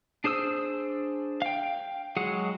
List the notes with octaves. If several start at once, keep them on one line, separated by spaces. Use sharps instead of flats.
D4 G#4 C5 D#6 E6
F5 G5
F#3 G#3 G#4 F#5